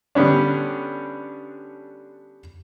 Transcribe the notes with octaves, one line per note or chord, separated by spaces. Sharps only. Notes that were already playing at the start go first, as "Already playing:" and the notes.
D3 G3 B3 C#4 D4